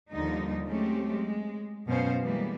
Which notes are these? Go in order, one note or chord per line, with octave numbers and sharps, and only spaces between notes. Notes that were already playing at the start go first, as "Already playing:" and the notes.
D#2 D3 F3 G3 D#4
F#3 G#3 A3 C4 C#4 G4
G#3
F#2 B2 C#4 C5 F5
E3 G3 G#3 A#3 B3